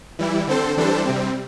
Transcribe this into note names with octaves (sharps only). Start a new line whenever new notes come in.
E3 G3 E4
D3 C4 A4 C5
E3 G3 D4 A4 C5
C3 G3 C4